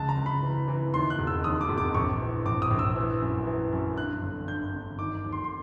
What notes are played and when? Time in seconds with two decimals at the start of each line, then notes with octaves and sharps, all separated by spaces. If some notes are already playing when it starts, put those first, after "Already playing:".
Already playing: C#2 A5
0.09 A#5
0.17 C#2
0.26 B5
0.43 E3
0.68 E3
0.93 D#2 C6
1.10 F#6
1.19 E1
1.27 E6
1.44 D#2 D#6
1.61 D6
1.69 E1
1.78 D6
1.95 A#1 C#6
2.21 E3
2.45 A#1 D6
2.62 D#6
2.71 A#1
2.79 E6
2.96 E3
3.21 F#2
3.47 E3
3.72 F#2
3.97 G2 F#6
4.23 G1
4.48 G2 G6
4.74 G1
4.99 D#3 D6
5.24 D#2
5.32 C6
5.44 C6